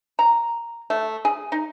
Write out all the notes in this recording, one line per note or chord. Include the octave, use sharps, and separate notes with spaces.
A#5
A3
G#4
D#4